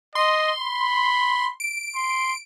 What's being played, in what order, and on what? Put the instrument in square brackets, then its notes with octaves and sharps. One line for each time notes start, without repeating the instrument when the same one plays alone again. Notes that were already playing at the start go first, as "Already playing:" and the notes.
[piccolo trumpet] D#5 [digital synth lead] C6
[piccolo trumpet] B5
[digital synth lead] D7
[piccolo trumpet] C6